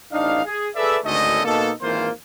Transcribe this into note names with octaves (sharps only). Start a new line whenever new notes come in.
A1 D4 D#4 F5
G#4
G#4 A4 B4 D5 E5
G#1 D2 D3 A3 C#4 D#5
B2 A#3 D#4 A4
G#1 E3 A#3 F4 C5